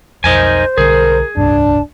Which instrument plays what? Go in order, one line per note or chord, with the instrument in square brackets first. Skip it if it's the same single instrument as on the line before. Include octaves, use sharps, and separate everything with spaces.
[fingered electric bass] B1 F2 [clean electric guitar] D#4 A#4 G#5 [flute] C5
[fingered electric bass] B1 D3 G3 [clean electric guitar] G#4 [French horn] A#4
[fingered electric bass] D1 C2 G2 [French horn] D4 [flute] A5